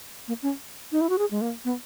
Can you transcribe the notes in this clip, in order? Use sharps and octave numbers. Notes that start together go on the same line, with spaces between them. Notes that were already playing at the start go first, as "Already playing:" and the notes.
A#3
C#4
D#4
E4
F#4
G#4
G#3
A#3
B3